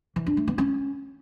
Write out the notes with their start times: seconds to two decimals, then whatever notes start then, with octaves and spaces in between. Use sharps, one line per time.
0.16 E3
0.26 D4
0.37 A3
0.48 B3
0.58 C#4